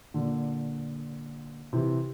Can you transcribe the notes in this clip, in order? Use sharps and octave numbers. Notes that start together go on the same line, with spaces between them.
A#2 D3
C3 E3